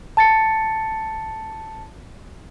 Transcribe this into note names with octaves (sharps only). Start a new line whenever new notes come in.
A5 A6 C#7